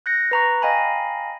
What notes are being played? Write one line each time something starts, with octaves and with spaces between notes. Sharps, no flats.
F#6 G6 A#6 C#7
B4 A#5 C#6
D#5 F5 G5 G#5 A#5 B5